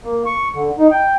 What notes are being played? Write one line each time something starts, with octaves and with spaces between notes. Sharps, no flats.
A#3
C#6
D3
D#4
G5